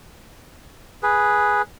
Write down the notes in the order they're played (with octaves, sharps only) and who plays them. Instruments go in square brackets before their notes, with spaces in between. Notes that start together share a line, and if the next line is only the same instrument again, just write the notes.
[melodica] G#4 B4